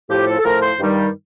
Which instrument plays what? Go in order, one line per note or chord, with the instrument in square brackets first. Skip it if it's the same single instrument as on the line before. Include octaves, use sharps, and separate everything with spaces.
[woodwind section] A2 F3 G4
A4
A4
A2 F3 A#4
C5
G2 D#3 G3